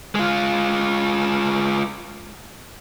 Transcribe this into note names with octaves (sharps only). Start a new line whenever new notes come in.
G#3 F4